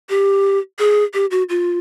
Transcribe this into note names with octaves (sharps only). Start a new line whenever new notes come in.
G4
G#4
G4
F#4
F4